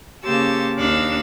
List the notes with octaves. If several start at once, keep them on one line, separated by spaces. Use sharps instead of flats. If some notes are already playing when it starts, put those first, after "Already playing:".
C#3 A#3 G4 C5 A5 E6
D#2 D4 D#4 F5 E6 F#6